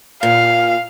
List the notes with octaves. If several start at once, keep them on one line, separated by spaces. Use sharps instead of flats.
A#2 F5